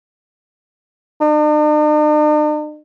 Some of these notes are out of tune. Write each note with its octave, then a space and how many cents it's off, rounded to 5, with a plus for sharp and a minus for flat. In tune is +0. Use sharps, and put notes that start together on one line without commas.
D4 +45